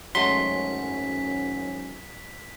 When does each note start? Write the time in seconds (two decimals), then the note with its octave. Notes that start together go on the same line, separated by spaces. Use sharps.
0.15 G#1 F#2 F#3 G#3 A3 C#4 C6 B6